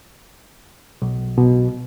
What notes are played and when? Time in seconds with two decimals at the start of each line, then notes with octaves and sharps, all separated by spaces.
1.02 B1
1.38 B2